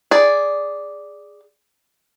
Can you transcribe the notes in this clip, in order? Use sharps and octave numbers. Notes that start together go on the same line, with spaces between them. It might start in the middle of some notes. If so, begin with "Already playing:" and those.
G#4 D5